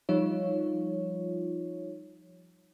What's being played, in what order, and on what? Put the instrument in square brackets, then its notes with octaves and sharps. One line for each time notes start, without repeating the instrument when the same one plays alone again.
[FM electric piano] F3 G3 D#4 F4 C#5